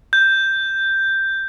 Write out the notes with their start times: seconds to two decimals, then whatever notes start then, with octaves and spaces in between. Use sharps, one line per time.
0.13 G6